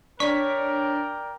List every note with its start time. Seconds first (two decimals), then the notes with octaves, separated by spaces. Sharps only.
0.20 D4 A#4 C#5 D5 G5 C#6 B6